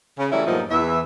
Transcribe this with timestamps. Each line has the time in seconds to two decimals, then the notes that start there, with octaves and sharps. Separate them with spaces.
0.19 C#3
0.32 E3 F#3 G3 A3 C#4 E4
0.47 G2 A#2 F3 F#3 A3 D#4
0.70 E2 E3 E5